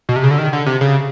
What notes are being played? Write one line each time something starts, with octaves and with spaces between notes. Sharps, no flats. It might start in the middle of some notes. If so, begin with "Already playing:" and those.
B2
C3
C#3
D3
D#3
D3
C3
C#3